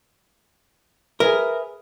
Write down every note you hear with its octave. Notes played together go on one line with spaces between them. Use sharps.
G#4 A#4 B4 E5